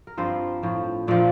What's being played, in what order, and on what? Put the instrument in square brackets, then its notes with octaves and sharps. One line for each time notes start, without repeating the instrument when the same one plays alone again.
[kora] A#4
G2 F3 C4 C5
A2 F3
A#2 F3 D4 D5